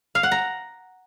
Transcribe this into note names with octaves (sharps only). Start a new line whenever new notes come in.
F5
F#5
A#5